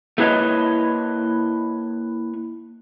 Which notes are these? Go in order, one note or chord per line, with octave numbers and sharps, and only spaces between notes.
A3 A#3 E4 B4 C#5 D#5